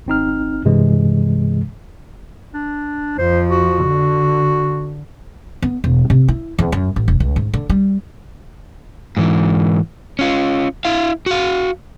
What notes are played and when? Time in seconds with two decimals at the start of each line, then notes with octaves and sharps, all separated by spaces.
0.06 G#1 C4 D#4 F6
0.65 G2 C3 E3 G#3
2.54 D4
3.18 F2 F3 C5
3.51 F#4
3.85 D3
5.62 B3
5.84 E1
6.10 C3
6.28 E4
6.59 E2
6.72 F#2
6.96 A1
7.08 E1
7.20 C#2
7.36 G#2
7.54 D3
7.70 G3
9.17 G#2 E3
10.19 C#4 F4
10.85 E4 F5
11.26 F#4 F5